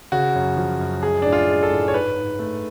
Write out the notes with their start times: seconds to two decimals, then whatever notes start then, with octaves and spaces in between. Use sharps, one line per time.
0.12 C#3 F#4
0.35 F#2
0.57 F3
0.80 F#2
1.03 G#3 G#4
1.22 A2 D4
1.33 F4
1.48 G#3
1.63 A4
1.71 A2
1.88 C#5
1.93 G#2 B4
2.16 G#2
2.39 A3